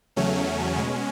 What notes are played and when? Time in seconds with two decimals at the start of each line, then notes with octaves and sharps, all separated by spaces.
0.16 E2 C#3 F#3 A3 C#4
0.77 B2 G#3